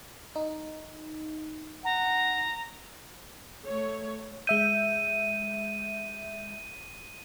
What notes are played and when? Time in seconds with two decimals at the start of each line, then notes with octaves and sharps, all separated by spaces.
0.36 D#4
1.85 F#5 A#5
3.66 A3 C#5
4.47 G#3 E5 G6 D#7